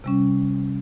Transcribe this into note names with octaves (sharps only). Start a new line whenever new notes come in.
C3 G3 C#4